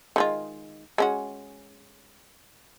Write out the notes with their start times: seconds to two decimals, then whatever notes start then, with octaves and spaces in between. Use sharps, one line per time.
0.16 D#3 G#3 F4
0.98 G#3 C#4 F#4